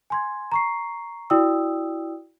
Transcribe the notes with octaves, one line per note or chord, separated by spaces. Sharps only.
G#5 C6 G#6
A#5 C#6 C7
E4 F#4 D5 G5 D#6 E6